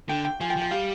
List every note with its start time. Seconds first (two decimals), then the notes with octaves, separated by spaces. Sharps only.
0.09 D3 G5
0.25 G5
0.40 F3 G#5
0.50 G5
0.56 F3
0.62 G5
0.71 G3 F5